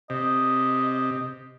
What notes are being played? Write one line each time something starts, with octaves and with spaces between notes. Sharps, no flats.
C3 D#5